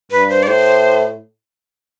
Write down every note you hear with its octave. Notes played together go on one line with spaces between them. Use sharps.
G2 B4
C5
D5
A2 C5